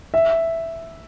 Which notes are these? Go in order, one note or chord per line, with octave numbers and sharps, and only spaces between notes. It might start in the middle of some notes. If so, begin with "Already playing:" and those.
E5